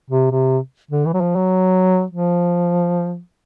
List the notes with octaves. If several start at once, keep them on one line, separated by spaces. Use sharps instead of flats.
C3
C3
D3
E3
F#3
F3
F#3
F3